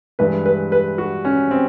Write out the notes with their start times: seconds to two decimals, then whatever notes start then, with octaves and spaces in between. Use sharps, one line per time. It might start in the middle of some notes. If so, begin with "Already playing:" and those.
0.19 G2 E3 G#3 B4
0.46 B4
0.72 B4
0.98 F#4
1.25 C#4
1.51 C4